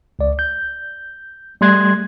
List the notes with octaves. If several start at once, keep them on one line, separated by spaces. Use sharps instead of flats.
C#2 D5
G6
G3 A3 C6 F#6 G#6